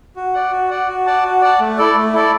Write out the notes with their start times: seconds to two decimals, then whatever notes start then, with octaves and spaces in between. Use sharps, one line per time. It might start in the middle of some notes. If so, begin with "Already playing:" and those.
0.16 F#4
0.34 D5 F#5
0.52 F#4
0.70 D5 F#5
0.88 F#4
1.06 D5 F#5 A5
1.24 F#4
1.41 D5 F#5 A5
1.60 A3
1.78 E4 A4 D5
1.96 A3
2.13 E4 A4 D5